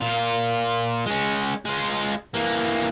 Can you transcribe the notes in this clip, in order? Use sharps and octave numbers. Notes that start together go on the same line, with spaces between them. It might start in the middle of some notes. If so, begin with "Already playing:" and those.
A#2 F4
G#3 C#4
G#3 F4
E3 A#3